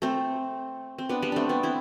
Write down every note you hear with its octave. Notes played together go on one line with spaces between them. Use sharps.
A3 C4
C4
B3 D4
G3 B3
A3 C4 D4
B3 D4
C4 E4